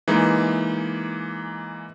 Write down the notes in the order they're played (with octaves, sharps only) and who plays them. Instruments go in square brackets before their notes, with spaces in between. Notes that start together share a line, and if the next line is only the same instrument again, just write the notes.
[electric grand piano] E3 G#3 A#3 D#4